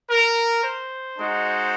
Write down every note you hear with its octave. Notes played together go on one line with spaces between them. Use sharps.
A#4
C5
G#3 D#4 F#4